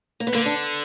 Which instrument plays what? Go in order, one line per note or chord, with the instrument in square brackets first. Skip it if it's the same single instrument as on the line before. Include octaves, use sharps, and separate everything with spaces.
[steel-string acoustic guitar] A#3
B3
[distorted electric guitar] D3 [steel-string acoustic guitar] A#3
[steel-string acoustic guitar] D4